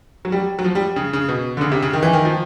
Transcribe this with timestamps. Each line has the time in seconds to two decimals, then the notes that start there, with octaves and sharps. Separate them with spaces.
0.25 F#3
0.32 G3
0.59 F#3
0.64 F3
0.75 G3
0.96 C#3
1.13 C#3
1.28 B2
1.57 D3
1.61 C#3
1.72 C3
1.82 C#3
1.93 D#3
2.03 E3
2.13 D#3
2.25 F3